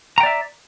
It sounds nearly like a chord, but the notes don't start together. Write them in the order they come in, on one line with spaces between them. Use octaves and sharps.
A#5 G5 D5 E5